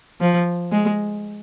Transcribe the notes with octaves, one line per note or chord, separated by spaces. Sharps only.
F3
G#3